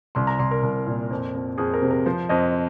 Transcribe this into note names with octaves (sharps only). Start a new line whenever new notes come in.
C2 C6
A#5
C2 C6
A#4
C2
A#2
F2
F2
F2 G#4
A#4
C3
A#4
F3 C5
F2 D#5